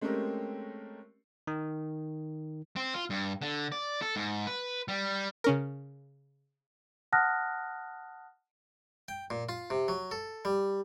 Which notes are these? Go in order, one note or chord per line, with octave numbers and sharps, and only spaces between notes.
G#3 A3 C4 C#4 G4 A#4
D#3
C4
F4
G2
D3
D5
A4
G#2
B4
G3
C#3 C#4 A#4
F#5 A5 D#6 F6 F#6 A#6
G5
A#2
F4
C3
F#3
A4
G3